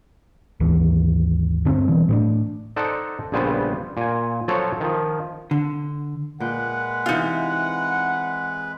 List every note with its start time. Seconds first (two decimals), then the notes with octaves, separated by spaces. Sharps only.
0.60 G#1 D#2 E3
1.65 G2 D3 C4 C#4
1.88 G2 B2 E3
2.09 A2 B3 D4
2.76 D#4 A4 C5 D5 F#5
3.32 A#1 C#3 G3 B3 C5
3.97 A#2 G#5
4.48 F3 F#3 A4 C5 C#5
4.81 D#3 F3
5.51 D3
6.40 A#2 G#3 B4 F#5 G5
7.06 C3 E3 D#4 F4